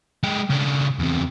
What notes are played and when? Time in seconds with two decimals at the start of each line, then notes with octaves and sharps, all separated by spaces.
0.23 G#3 G4
0.50 C#3 D4
1.00 E2 C3